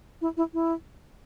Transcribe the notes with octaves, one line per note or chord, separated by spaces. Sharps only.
E4
E4
E4